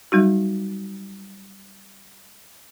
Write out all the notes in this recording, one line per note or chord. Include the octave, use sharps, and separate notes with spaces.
F#3 G3 D#4 F#4